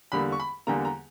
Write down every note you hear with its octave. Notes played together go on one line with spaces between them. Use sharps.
E2 D3 G3 A#3 B5
C#6
B5
E2 D3 G3 A#3 A#5
A#5